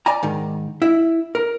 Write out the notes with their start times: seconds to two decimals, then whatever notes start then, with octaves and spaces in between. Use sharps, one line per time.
0.06 D5 G#5 A#5
0.23 G#2 D#3
0.82 E4 E5
1.35 A#4